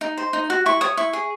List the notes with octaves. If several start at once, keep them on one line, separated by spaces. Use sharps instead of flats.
D#4
C5
D#4
F#4
E4 C#6
C#5 D#6
E4 C#6
G#4